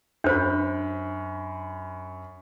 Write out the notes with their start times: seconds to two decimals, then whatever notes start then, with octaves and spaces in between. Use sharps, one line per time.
0.24 F#2 D4 C5 B5